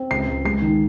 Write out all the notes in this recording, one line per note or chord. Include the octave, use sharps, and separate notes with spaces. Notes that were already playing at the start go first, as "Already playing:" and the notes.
Already playing: C4
C#2 C7
C#2
G#3 C7
D#3